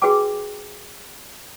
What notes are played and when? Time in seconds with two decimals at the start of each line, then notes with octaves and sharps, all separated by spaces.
0.02 F#4 G#4 B4 G5 G#5 D6